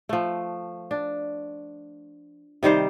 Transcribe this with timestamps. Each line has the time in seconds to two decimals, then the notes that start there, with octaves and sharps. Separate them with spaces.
0.09 F3 A3
0.91 D4
2.63 C3 D#3 G3 C5